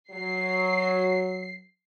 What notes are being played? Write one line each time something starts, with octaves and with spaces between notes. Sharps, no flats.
F#3 C7